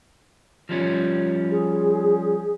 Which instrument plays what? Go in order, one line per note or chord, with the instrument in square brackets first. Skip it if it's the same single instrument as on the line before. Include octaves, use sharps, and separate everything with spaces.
[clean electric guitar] F3 G3 C#4
[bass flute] G#4